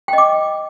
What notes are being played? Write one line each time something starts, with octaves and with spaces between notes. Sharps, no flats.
D#5 G5 D6